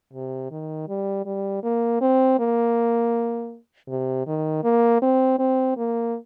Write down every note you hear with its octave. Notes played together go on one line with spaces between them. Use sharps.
C3
D#3
G3
G3
A#3
C4
A#3
C3
D#3
A#3
C4
C4
A#3